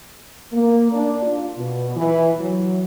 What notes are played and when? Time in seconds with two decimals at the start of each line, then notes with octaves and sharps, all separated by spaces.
0.53 A#3
0.92 D4
1.23 F4
1.57 B2
1.96 E3
2.39 F#3